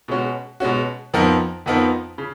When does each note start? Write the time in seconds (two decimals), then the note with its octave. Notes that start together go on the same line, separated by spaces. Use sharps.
0.08 B2 G#3 C#4 F#4
0.60 B2 G#3 C#4 F#4
1.14 F2 F3 B3 D#4 A#4
1.66 F2 F3 B3 D#4 A#4
2.18 C#3